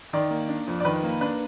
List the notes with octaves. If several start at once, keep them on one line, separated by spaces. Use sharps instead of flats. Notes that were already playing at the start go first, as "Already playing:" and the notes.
D#3 D5
A#3
D4
F2
D5
D#3 B4
A#3
D4 B4